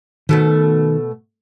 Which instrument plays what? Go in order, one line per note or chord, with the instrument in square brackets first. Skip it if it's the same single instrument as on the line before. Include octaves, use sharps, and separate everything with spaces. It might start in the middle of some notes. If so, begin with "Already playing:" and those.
[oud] B2 A3 B3 [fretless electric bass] D#3